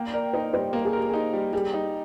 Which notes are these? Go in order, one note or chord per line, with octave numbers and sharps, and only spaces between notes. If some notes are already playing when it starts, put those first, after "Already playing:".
Already playing: A#3 G5
A#4 D5
D#4 C5
G3 C5
A#3 A#4
G#4
G4 A#4
D#4 G#4
G3
G3 G#4
D#4